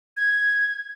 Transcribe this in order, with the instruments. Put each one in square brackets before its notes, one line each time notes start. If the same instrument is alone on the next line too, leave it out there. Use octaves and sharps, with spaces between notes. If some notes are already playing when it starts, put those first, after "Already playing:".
[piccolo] G#6